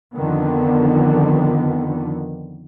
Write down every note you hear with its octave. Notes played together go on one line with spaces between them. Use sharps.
F2 D3 D#3 B3